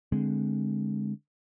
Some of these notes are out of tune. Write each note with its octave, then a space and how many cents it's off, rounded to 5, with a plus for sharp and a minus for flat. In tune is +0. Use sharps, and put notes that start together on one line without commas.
D3 +0 G#3 +0 C4 -15